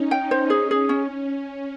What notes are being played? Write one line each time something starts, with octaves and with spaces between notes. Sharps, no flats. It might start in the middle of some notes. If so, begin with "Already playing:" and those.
Already playing: C#4 D#4
D#4 G5
C5
C#4 G#4
G#4
C#4